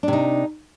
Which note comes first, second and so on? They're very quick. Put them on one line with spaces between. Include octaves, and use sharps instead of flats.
D4 C3 D#4